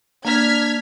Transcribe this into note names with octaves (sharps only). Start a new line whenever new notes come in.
A#3 D4 F6 G#6 B6